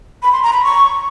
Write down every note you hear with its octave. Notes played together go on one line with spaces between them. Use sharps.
B5
C6
A#5
B5
C#6